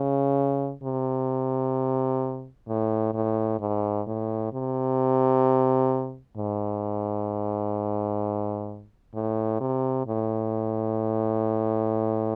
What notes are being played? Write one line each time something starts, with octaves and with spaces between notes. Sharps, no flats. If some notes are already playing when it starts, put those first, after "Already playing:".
Already playing: C#3
C3
A2
A2
G#2
A2
C3
G#2
A2
C3
A2